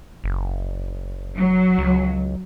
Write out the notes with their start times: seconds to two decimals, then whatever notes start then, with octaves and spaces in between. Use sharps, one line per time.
0.24 F#1
1.37 F#3
1.78 C#2